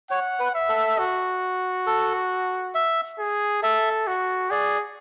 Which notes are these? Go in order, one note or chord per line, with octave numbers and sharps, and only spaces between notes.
C#5 F#5
B4
E5
A4
F#4
A4
E5
G#4
A4 E5
F#4
G#4 D5